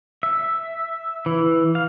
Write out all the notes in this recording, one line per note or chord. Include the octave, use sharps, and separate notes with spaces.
E5
E3
F5